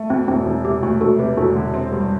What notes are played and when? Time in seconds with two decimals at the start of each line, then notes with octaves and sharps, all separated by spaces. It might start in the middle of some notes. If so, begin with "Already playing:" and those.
Already playing: A3
0.10 D2 C4
0.28 E1 C4
0.46 E1
0.65 C3 G4
0.83 D2 F#4
1.01 E1 F#4 A4
1.19 C3 G4 B4
1.37 E1 F#4 A4
1.56 D3
1.74 C4
1.92 G2